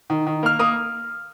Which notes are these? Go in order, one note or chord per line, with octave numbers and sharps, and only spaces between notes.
D#3
D#3
A#3 F6
A#3 D#6